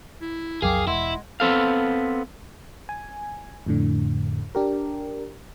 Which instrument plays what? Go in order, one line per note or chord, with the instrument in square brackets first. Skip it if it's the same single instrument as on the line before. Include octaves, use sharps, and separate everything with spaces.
[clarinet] E4
[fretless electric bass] B1 F2 F#3 [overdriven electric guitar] G#4 [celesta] A#4 G5 D6 [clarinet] F5
[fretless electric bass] E1 [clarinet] G#3 [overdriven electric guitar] E4 [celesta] F#5 C6 E6
[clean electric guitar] B3 C4 A4 F5
[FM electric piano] G#5
F2 A2 D3
D4 G4 A#4